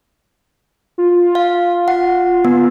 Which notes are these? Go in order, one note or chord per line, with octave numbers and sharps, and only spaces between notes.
F4
F5
F#5
B3